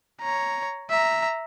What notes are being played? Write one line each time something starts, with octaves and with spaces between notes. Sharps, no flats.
C#5 A#5
E5 A#5